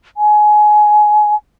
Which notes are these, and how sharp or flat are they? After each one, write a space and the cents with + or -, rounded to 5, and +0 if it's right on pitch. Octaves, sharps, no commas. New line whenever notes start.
G#5 +20